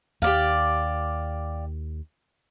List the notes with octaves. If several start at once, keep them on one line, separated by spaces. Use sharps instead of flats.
D#2 G4 D5 F5